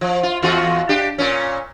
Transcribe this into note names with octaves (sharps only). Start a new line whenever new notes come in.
F3
F4
E2 F4 F#4
D4 G4
A#2 C#4